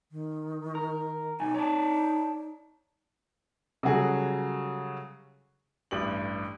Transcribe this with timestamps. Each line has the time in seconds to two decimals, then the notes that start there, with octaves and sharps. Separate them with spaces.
0.12 D#3
0.75 A#4
1.40 B1 D#4 G#5
1.54 C#5 D5 A5
3.83 C#3 F#3 G3 F#4 G#4 A4
5.91 A1 G2 G4 D5 F#7